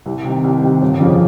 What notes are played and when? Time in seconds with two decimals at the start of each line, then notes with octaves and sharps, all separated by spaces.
0.06 C2
0.25 C3 D#3
0.44 C2
0.63 C3 D#3
0.82 G1
1.00 F2 C#3 F3